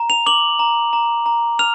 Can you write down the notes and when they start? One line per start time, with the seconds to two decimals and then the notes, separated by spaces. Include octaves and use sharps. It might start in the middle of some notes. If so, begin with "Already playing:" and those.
Already playing: A#5
0.10 F7
0.26 D6 F#7
0.59 A#5
0.93 A#5
1.26 A#5
1.59 F6 F7